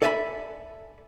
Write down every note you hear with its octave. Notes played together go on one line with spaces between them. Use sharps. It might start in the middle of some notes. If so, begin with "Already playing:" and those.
A4 D5 E5 G#5 A#5 B5